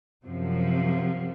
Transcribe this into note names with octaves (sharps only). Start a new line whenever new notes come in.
F#2 C3 F3